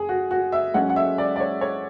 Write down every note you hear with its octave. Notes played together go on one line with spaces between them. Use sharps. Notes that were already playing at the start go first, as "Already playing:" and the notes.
Already playing: F#1 G#4
F#4
F#4
E5
G#2 F#3 C#4 F#5
F#5
E5
D5
D5
C#5
C#5